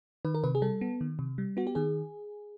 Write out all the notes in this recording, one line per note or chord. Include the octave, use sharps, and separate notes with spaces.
D#3 B4
A#4
C3 B4
G#4
G3 A4
B3
D#3
C3
G3
B3 F#4
G4
D#3 G#4